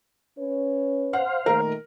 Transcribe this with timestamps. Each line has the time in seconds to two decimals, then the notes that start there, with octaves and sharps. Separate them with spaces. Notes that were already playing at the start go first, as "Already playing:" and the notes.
0.38 C#4 B4 C#5
1.13 C5 F5 F#5
1.46 A#2 D#3 A3 A#4